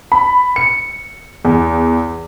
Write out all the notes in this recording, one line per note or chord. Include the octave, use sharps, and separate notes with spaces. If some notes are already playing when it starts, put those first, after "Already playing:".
B5
C#7
E2